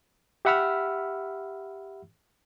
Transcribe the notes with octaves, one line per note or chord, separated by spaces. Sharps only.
G4 E5 F#5 B5 E6 F6